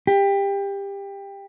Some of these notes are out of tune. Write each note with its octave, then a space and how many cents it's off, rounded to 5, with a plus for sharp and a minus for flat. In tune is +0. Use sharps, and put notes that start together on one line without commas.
G4 +20